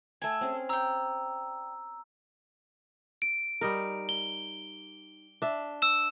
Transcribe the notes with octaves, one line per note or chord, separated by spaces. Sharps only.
A3 A4 G5 G#5
C4 C#4 G#4
D5 G5 A#5 E6
D7
G3 D#4 A#4
G7
D4 E5
E6 E7